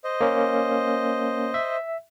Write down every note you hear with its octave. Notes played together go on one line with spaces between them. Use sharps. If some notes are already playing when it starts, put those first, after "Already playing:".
C5 D#5
A#3 C#4
E5